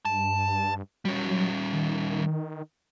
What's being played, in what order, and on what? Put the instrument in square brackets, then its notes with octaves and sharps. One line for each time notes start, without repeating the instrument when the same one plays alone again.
[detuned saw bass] G2 [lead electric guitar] A5
[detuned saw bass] F#3 [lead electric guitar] G3 C#4
[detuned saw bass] D#3